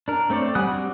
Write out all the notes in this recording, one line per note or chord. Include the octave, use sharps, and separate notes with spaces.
D4 A#4
A3 C4 C#5 D5
G3 F#5 G#5 D#6 F#6
G3 C4 D4 F#4